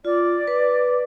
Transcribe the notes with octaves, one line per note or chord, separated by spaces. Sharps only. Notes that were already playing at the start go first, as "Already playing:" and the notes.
F4 D5
B4